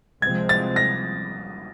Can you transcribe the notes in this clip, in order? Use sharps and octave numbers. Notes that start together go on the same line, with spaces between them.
C3 F3 G#3 C4 G#6
A6
A#6